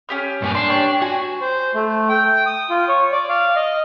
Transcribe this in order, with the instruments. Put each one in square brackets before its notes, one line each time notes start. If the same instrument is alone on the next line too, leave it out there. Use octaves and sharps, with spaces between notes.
[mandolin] C#4 G4 F6
[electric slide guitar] G2 A#3 G#5
[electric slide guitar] D4 [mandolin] C6
[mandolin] G4 C#5
[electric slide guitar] F#4 [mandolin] G#5
[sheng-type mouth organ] C5
A3
G5
D#6
F4
C#5
D5
F5
D#5